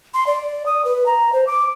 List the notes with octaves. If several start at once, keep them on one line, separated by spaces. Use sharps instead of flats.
C6
D5
D#6
B4
A#5
C5
D6